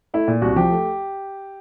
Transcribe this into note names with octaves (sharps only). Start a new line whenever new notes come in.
A3 E4
A#2
C2 F#4
F3 G4
A3